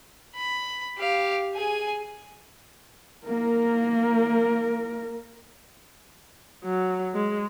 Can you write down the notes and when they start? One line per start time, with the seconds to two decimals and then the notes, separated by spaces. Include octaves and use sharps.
0.36 B5
0.99 G4 F5
1.55 G#4 G#5
3.27 A#3 A#4
6.64 F#3
7.14 G#3